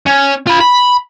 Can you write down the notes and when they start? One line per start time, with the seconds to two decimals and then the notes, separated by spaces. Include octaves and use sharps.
0.07 C#4
0.47 F4 B5
0.60 B5